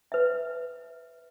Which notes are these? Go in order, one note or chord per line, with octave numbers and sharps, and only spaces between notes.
B4 E5